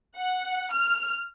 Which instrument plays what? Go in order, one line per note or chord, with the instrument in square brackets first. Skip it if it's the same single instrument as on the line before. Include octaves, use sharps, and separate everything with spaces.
[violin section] F#5
F6